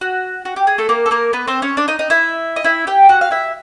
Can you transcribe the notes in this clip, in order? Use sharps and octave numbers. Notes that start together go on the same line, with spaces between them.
F#4
F#4
G4
G#4
A3 A4
A#3 A#4
A4
A#3 A#4
B3 B4
C4 C5
C#4 C#5
D4 D5
D#4 D#5
D#4 D#5
E4 E5
D#5
E4 E5
G4 G5
F#4 F#5
F5
E4 E5